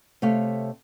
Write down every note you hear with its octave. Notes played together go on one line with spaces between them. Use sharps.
C3 A3 C#5 F5